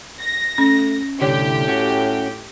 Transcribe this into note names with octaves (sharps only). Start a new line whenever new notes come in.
A#6
A3 C#4
C2 A2 D3 G4 C#5
C#4 F#4